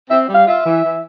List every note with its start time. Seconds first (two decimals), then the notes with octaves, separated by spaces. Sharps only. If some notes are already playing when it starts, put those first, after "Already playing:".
0.09 C4 E5
0.28 G3
0.34 F5
0.47 F4 E5
0.65 E3
0.84 E3